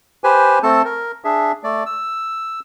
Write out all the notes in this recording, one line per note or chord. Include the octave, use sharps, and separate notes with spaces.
G4 B4 C5 G#5
A3 C4 A4 A5
A#4
D4 G#4 E5
A3 D5
E6